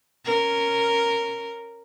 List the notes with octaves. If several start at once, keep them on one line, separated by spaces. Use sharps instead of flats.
C#4 A#4